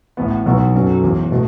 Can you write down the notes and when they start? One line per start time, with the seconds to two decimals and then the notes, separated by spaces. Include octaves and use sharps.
0.17 A1 A2 E3 B3
0.45 B1 B2 F#3 B3 F#4
0.74 F#2 F#3 C#4 A4
1.02 E1 E2 E3
1.32 B2 A3